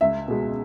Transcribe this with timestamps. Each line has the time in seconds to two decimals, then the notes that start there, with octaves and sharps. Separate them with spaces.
0.01 C#2 E5
0.28 B2 G#3